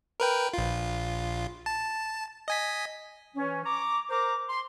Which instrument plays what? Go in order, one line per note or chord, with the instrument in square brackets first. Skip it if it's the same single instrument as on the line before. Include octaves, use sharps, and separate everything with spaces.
[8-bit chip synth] A#4 B4 G5
A#1 F4
A5
D#5 G#5 B6
[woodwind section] E3 C#4
A#5 C#6 D6
A#4 C5 A#5 D6
C6